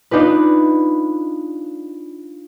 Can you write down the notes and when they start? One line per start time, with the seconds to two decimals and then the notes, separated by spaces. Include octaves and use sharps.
0.11 D4 D#4 F4 B4